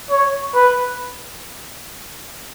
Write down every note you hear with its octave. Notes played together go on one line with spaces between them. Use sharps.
C#5
B4